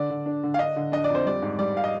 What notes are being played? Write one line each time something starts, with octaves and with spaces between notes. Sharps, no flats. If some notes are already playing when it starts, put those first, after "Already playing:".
Already playing: D3 D5
D3
D4
D3
F5
D4 D#5
D3
D4 D#5
D5
F2 C5
G3 D5
G#2
G3 D5
F5
D#5